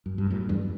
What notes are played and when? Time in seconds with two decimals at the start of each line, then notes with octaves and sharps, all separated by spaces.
0.06 F#2
0.18 G2
0.31 F#2 A2
0.49 E2 G2